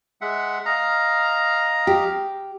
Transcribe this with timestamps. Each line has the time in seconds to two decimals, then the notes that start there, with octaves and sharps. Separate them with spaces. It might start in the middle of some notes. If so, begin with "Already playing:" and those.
0.21 G#3 E5 F#5
0.65 D#5 F5 A#5
1.87 G4